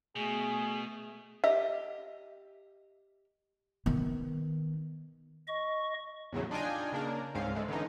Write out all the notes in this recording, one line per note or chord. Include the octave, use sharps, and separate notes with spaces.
B2 A3 G#4
G4 D#5 E5
D#3 B3
D#5 C#6
E2 A2 C#3 F#3
D4 D#4 F4 D#5 G5 G#5
C#3 A#3 D4 A#4
C#2 G#2 C4 C#4 F5
D3 G#3 A3
D3 E3 B3 C#4 D#4